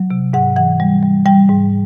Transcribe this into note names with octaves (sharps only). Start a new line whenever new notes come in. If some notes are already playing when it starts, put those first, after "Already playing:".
Already playing: F#3
C3
G#2 F#5
E3 F#5
G3
G3
G3 G5
G#2